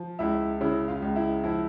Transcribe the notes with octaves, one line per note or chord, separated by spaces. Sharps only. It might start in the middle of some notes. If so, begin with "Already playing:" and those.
Already playing: F3
C#2 E4 E5
C#3 E4 E5
F4 F5
C#2
E4 E5
F3 E4 E5